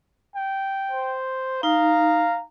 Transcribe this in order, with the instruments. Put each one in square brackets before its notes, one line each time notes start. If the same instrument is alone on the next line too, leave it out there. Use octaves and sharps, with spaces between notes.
[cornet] G5
[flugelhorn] C5
[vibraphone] D#4 [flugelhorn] F5 [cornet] A#5